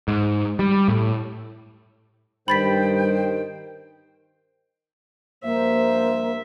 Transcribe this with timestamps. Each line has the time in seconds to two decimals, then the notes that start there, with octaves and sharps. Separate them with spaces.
0.08 G#2
0.59 G3
0.88 A2
2.48 G2 D#3 C5 G5 B5 A6 B6
5.44 G2 F3 A#3 C5 E5